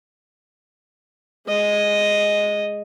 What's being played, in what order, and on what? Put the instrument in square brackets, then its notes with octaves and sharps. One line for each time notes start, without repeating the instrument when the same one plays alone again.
[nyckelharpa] G#3 D#5